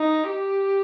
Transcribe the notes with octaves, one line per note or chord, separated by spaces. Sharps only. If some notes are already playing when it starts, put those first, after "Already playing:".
Already playing: D#4
G4